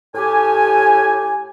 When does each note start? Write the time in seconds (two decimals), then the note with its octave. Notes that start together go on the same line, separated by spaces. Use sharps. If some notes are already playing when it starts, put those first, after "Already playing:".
0.15 A2 G4 G#5